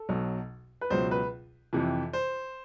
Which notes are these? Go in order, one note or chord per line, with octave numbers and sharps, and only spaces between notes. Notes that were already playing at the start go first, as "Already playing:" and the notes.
Already playing: A4
B1 B2 F#3
B4
C#2 B2 F#3 C5
B4
F2 C3 E3
C5